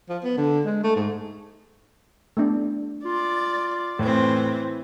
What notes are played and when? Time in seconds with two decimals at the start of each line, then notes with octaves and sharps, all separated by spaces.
0.09 F3
0.24 B3
0.38 D3
0.65 G#3
0.84 A3
0.96 G#2
2.37 A3 B3 D4
3.05 F4 D5
3.99 A2 E3 C4